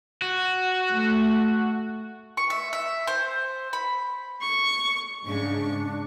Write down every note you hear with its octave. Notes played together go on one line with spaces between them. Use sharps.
F#4
A3
C#6
E5
E5
C5
B5
C#6
G#2 C#3 D4 C#6